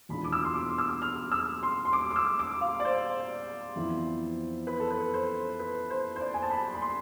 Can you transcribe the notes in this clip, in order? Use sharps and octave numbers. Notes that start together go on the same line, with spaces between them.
E2 B2 G#3 D4 F4 B5
D6
E6
C6
D6
E6
F6
E6
C6
C6
D6
D6
E6
D6
F5
D5
C5
F2 E3 B3 E4
B4
A4
B4
C5
B4
C5
C5
D5
G#5
A5
B5
B5
C6